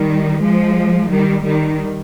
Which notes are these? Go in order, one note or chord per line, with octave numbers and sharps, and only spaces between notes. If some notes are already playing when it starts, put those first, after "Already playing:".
Already playing: D#3 G3
F3 G#3
D#3 G3
D#3 G3